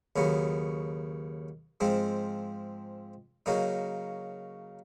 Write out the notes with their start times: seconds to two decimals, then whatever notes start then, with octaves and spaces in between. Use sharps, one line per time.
0.16 D#2 C#3 F#3 B3
1.80 G#2 F3 G#3 C4
3.46 C#3 F#3 A#3 D#4